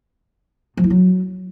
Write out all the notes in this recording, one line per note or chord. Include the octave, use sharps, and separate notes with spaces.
F3
E4
F#3